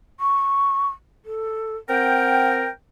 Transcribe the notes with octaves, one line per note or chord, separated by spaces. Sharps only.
C#6
A4
C4 A#4 F#5 G5